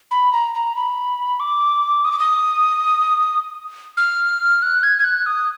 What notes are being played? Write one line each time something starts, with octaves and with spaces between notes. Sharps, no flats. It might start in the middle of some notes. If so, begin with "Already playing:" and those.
B5
A#5
A#5
B5
D6
D#6
D6
D#6
F6
F#6
G#6
G#6
F#6
D#6